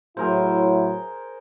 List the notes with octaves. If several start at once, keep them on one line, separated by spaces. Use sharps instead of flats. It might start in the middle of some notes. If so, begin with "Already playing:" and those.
A2 F#3 E4 G#4 A#4 C5